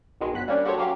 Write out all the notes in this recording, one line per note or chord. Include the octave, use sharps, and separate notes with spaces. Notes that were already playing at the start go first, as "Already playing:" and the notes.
B1 B2 D#3 G#3
G1 F#3 F#6 B6
G3 A#3 C#4 D4
F#4 G4 A4 C5 C#5
F#3 A#3 C#4 G4 F5